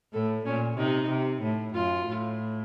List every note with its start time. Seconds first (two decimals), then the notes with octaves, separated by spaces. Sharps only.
0.13 A2 A4
0.46 A#2 C#4
0.77 C3 D#4
1.10 C3
1.42 A2
1.74 F#2 F4
2.07 A2